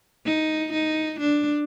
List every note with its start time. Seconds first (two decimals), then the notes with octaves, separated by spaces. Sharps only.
0.26 D#4
0.73 D#4
1.20 D4